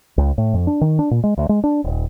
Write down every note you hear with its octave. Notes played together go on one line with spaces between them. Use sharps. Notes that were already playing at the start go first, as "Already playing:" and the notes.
C#2
A2
F2
D4
D#3
D4
A#2
G#3
D2
G#3
D4
D#1